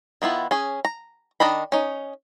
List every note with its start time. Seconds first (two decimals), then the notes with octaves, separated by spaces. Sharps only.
0.22 D#3 B3 E4 F4
0.51 C#4 G#4
0.85 A#5
1.40 D#3 D4 D#5 B5
1.72 C#4 D#4